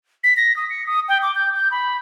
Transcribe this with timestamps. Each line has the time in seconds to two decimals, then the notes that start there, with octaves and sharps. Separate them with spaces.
0.24 B6
0.37 A#6
0.56 D#6
0.70 C#7
0.86 D#6
1.08 G5
1.22 D6
1.35 G6
1.56 G6
1.71 B5